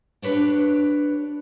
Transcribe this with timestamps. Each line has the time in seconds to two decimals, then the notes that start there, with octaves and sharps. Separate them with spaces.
0.22 D4 G4 B4 C#5 D5